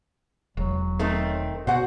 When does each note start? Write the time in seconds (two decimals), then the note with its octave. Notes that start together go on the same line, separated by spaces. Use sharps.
0.57 E1 F#3
0.99 D#3 A3 C4
1.67 B2 F#4 C5 F#5